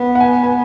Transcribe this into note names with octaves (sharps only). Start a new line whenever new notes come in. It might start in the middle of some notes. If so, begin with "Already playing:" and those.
Already playing: B3
F#5
G#5
G#5